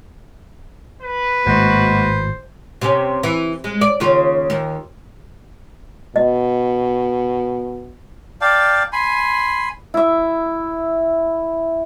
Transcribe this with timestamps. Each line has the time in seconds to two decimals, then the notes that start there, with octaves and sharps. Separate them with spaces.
1.02 B4
1.46 G#1 A2 G#3 A#3 F#4 C5
2.82 C3 C#4
3.23 E3
3.64 G#3
3.81 D5
4.00 D#2 C#3 F4
4.50 D#2
6.16 B2 D#5
8.41 D5 F5 G5 A5
8.93 G#5 B5 C6
9.94 E4 E5